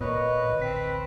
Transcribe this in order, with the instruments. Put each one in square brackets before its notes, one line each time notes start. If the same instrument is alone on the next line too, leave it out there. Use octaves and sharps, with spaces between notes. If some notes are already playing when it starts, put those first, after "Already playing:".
[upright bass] A#2 [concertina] B4 [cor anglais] C#5 [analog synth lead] D#5
[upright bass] A1 D2
[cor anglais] C4 [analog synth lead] B6